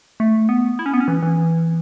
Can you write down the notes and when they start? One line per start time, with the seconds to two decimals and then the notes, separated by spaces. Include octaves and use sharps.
0.20 A3
0.49 B3
0.79 E4
0.86 C#4
0.94 B3
1.00 C#4
1.08 E3
1.23 E3